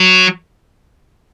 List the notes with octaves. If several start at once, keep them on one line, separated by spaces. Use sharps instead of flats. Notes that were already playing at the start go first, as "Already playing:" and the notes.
Already playing: F#3